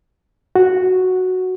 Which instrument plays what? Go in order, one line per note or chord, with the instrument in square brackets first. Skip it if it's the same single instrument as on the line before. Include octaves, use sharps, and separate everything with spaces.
[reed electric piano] F#4